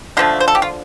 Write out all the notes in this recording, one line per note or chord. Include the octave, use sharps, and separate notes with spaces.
D3 F3 A3 F4
C5
A4
G4
F4